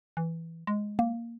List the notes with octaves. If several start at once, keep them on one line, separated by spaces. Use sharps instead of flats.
E3
G#3
A#3